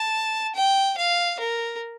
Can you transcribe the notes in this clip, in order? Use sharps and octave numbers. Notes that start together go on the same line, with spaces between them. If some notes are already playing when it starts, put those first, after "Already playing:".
Already playing: A5
G5
F5
A#4